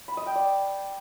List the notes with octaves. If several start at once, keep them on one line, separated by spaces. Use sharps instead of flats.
B5
D#5
G5
D5